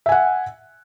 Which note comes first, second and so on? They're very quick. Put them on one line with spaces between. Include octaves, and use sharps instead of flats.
E5 G#5 F#5